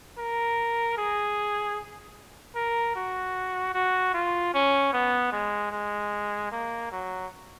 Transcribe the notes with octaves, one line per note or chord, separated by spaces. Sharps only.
A#4
G#4
A#4
F#4
F#4
F4
C#4
B3
G#3
G#3
A#3
F#3